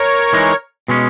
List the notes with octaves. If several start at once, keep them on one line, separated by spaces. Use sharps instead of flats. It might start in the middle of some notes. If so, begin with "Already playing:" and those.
Already playing: A#4 C#5
E3 G#3 D#4
B2 G#3 C#4